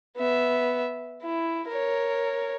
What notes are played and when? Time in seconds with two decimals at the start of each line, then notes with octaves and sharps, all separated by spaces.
0.16 B3 E5
1.23 E4
1.69 A#4 C#5